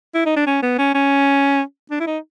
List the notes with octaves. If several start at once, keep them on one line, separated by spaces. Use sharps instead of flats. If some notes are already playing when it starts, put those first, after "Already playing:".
E4
D#4
D4
C#4
B3
C#4
C#4
D4
E4
D#4